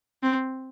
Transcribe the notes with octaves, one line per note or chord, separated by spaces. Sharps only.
C4